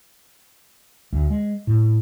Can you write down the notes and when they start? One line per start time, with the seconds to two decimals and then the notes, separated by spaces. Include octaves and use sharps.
1.12 D2
1.30 G#3
1.67 A2